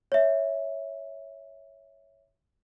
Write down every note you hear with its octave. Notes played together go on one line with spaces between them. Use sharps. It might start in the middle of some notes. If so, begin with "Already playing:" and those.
C#5 E5